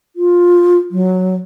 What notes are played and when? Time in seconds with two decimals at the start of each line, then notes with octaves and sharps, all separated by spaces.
0.16 F4
0.91 F#3